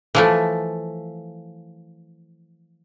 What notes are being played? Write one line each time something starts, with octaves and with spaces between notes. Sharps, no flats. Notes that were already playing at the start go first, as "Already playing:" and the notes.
E3 F3 A3